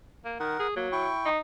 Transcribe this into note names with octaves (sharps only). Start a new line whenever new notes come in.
A#3
D#3 A#4 F#5
G#4
F#3 A#3
E4 G5 C#6
D#4